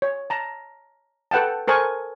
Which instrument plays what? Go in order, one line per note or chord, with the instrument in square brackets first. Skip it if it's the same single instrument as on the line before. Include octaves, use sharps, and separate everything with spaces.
[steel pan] C#5
A5 A#5
A4 B4 F#5 G5 A5
A4 A#4 C5 G#5 C#6